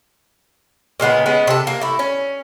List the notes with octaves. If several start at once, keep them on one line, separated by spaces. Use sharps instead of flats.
A#2 C#3 G#3 B3
G#3 B3 C#4
C3 A4
A#3
A3 E4
C#4